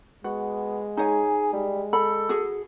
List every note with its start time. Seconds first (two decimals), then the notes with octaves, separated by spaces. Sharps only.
0.24 G#3 B3 F#4
0.97 D#4 G#4 C#5 G#5
1.53 G3 G#3
1.93 A4 B5
2.29 F#4 G#4